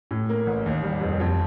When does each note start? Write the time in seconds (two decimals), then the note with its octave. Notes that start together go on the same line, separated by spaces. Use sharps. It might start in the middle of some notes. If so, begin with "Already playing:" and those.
0.11 A2
0.29 A#3
0.47 A1
0.66 D#2
0.83 G3
1.01 F1
1.20 F2